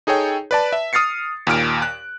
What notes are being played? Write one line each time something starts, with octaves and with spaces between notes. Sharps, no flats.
D#4 G#4 A4 C#5 G5
B4 D5 A5
E5
D#6 F6 A6 C7 C#7
D#2 A#2 F6 D7
F#6